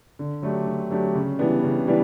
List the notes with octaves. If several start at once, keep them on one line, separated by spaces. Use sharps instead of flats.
D3
F#3 A3 D4 G4
D3
F#3 A3 D4 G4
C#3
E3 G3 B3 D4
C#3
E3 G3 B3 D4